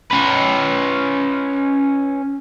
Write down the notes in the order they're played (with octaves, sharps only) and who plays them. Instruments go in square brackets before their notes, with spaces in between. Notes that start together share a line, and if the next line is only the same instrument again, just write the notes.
[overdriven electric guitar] C#4 B4